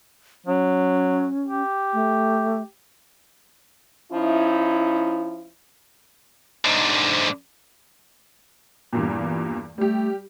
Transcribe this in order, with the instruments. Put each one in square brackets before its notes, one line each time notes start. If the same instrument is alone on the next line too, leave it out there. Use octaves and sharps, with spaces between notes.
[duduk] F#3 [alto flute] C#4
[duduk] G4
[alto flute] A3
[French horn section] F3 C#4 D#4 E4
[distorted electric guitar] G#2 D3
[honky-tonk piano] E2 G2 A#2
[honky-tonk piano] G3 G4 [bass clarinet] A3